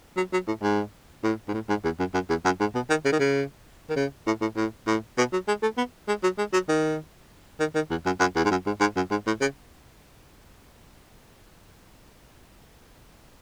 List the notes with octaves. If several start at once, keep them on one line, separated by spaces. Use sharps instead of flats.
F#3
F#3
A2
G#2
A2
G#2
A2
G#2
E2
F#2
F#2
E2
F#2
G#2
B2
D#3
C#3
D#3
C#3
D#3
C#3
A2
A2
A2
A2
B2
F#3
G#3
A3
B3
G#3
F#3
G#3
F#3
D#3
D#3
D#3
E2
F#2
F#2
E2
G#2
F#2
G#2
G#2
F#2
G#2
A2
C#3